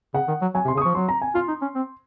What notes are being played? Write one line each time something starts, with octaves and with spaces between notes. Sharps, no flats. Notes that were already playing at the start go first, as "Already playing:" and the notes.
C#3 F#5
D#3
F#3
F#3 G#5
C3
C6
C#3
D#6
F3 C#6
F#3 C6
A#5
G#5
F4 C6
D#4
C#4
C4